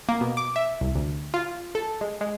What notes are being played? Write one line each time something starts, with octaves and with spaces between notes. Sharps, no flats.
A#3
B2
D6
E5
C2
D2
F4
A4
G#3
G#3